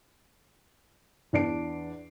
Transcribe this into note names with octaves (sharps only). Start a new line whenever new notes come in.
E2 D4 C7 D7